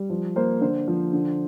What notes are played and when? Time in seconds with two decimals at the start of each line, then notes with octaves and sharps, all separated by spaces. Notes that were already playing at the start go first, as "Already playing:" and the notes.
Already playing: G3
0.10 F3
0.36 A#3 C5
0.61 D3 C5
0.88 F3
1.13 D3